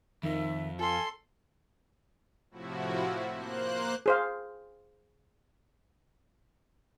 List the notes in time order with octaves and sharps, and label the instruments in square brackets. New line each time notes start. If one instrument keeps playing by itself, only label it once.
[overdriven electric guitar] F2 [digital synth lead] D#3 [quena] E5
[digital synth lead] F4 [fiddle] A4 C6 [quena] G#5
[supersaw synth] A2 C3 F3 E4 F#4
A#3 C5 F#6
[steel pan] G#4 C5 F5